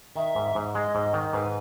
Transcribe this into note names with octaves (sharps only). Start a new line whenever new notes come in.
D#3 E5
G#2
G#2
G#3 D#5
G#2
D#3
G#2 B4